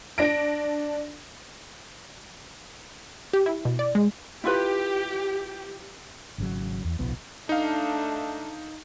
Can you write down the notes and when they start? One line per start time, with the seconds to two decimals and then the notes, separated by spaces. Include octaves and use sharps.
0.18 D4 A#6 D7
3.33 G4
3.46 E4
3.65 B2
3.79 D5
3.95 G#3
4.44 E4 F4 G4 B4
6.38 G#1 C#3 F#3
6.85 E2
6.99 D1 B1 F3 B3
7.49 A3 D4 D#4 F5